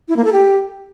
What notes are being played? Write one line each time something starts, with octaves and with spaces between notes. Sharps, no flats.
E4
A#3
A4
G4